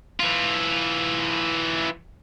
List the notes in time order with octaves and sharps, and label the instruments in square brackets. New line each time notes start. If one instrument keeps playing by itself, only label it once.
[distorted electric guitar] E3 F4